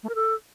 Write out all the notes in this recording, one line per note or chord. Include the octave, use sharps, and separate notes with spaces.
A3
A#4
A4